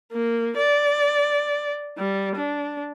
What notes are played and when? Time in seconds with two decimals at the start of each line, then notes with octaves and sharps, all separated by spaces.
0.12 A#3
0.57 D5
1.98 G3
2.36 D4